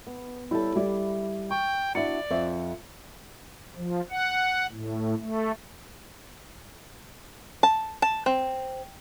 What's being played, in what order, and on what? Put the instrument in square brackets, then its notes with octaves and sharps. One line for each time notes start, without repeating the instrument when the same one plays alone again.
[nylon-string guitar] B3
[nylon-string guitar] G3 A4 [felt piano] E4 G4 C#5
[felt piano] G3 [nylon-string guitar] E4 D5
[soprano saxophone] G5 [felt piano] C#6
[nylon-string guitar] D4 E4 F#4 [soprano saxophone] D5 [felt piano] C#7
[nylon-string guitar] F2 C5 E5
[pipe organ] F3
F#5
A2
A3
[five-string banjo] A5
A5
C4